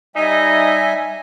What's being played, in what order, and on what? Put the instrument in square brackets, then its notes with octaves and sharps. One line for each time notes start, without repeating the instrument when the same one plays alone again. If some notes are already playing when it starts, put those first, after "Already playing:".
[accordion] G3 E5 G#5 [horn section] D#4 D#5